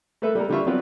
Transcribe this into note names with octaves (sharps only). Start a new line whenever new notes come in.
A3 A#3 A4 B4 E5
G3 A#3 A4 A#4
D3 G3 D4 F4 E5 C#6
F#3 B3 C4 F4 B4 D5